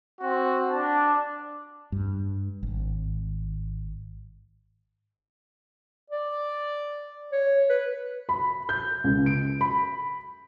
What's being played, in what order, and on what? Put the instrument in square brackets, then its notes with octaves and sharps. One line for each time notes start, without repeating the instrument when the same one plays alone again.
[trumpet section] C4 F#4
D4 A5
[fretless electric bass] G2
G#1
[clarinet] D5
C#5
B4
[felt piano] B5
G6
C#2
D7
B5